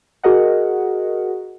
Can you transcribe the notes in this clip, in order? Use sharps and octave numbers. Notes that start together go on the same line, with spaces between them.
F#4 G#4 A#4 D#5 F#5